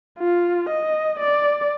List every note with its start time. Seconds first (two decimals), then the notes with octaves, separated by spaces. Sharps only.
0.19 F4
0.69 D#5
1.20 D5